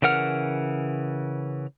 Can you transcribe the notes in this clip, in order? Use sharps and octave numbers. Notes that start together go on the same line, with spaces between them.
C#3 E3 A#4 F#5 F6